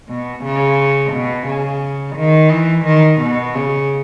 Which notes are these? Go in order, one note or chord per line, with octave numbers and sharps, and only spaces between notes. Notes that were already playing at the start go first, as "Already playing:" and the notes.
B2
C#3
B2
C#3
D#3
E3
D#3
B2
C#3